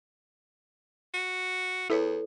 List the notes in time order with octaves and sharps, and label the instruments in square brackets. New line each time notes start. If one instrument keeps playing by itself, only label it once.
[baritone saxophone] F#4
[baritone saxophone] E2 [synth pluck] E4 B4 C#5 [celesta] A4